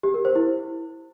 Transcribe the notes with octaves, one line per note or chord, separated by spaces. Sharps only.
G4
A#4
C5
E4